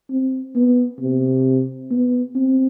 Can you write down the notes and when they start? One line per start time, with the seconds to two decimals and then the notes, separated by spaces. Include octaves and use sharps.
0.11 C4
0.55 B3
1.01 C3
1.91 B3
2.36 C4